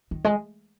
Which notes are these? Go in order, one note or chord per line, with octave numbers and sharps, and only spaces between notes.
D#3
G#3